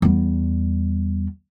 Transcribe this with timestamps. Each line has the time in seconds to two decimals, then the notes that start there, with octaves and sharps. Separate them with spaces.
0.02 E2 G3